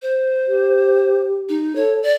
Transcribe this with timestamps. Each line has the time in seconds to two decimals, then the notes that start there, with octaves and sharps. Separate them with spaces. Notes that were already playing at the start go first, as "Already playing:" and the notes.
0.02 C5
0.47 G4
1.49 D#4
1.76 A4 C#5
2.03 D5